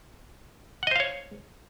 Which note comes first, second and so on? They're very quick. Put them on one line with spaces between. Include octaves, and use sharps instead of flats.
F#5 D#5 C5 F5 C#5